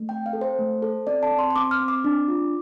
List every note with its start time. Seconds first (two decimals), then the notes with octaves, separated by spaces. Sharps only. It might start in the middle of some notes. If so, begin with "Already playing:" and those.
Already playing: A3
0.09 C4 G5
0.26 F5
0.33 A4
0.41 C5
0.59 A3
0.82 A4
1.07 C4 D5
1.23 A5
1.32 C4
1.39 C6
1.51 C6
1.56 C4 D6
1.71 F6
1.80 C4
1.88 D6
2.04 D4
2.28 F4